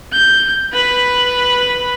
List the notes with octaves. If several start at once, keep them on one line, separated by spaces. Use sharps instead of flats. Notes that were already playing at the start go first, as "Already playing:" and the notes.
G6
B4 B5